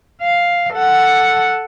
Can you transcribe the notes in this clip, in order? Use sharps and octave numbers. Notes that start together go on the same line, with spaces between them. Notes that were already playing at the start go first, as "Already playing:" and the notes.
F5
A4 F#5